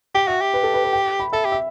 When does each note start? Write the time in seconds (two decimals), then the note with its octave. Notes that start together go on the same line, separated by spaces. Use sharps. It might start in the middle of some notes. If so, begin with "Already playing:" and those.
0.15 G4 G5
0.28 F#4 E5
0.41 G4
0.54 B4
0.63 A4
0.74 B4
0.84 B4
0.93 G5
1.20 B5
1.33 A4 E5
1.45 G4
1.52 E5